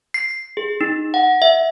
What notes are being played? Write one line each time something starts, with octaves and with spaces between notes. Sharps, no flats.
C7
G#4
D#4
F#5
E5